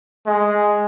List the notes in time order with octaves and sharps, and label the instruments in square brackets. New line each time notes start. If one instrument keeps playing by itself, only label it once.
[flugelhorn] G#3